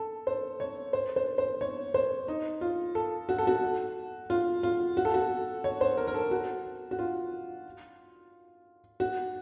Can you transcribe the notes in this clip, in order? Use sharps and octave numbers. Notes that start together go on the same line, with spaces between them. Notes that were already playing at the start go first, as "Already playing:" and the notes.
Already playing: A4
C5
C#5
C5
C5
C5
C#5
C5
D#4
F4
A4
F#4
A4
F#4
F4
F4
F#4
A4
F#4
C#5
C5
A#4
A#4
A4
F#4
F#4
F4
F#4